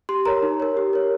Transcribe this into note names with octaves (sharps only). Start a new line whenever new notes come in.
G4 C6
A#4 C#5 A#5
D#4
A#4 C#5
G4
A#4 C#5